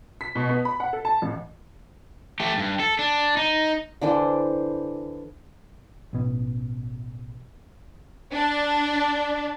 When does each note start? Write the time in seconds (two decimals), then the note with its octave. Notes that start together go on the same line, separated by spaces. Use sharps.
0.21 B6
0.35 B2
0.49 B3
0.65 B5
0.80 F#5
0.93 A4
1.05 A5
1.22 A1
2.40 A3 G4
2.58 G2
2.80 A4
2.99 D4
3.37 D#4
4.01 D3 E3 D4 C5
6.13 A1 B2
8.32 D4